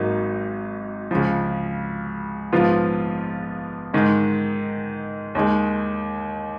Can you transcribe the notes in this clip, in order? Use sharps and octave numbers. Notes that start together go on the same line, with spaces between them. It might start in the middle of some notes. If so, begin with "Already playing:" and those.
Already playing: G#1 G#2 F#3 A#3 D#4
C#2 C#3 F3
A#1 G#2 F3 B3 F4
G#2 D#3 G#3
D#2 D#3 G#3